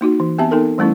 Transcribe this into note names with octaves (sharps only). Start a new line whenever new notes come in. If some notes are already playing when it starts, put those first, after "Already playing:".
A#3 D#4 F#4
E3
B3 C4 G4 E5 A5
B3 D#4 A4 A#4
E3 G3 A3 C#4 E4